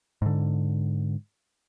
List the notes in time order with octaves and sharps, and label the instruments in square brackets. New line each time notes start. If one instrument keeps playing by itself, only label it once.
[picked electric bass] G#2 D3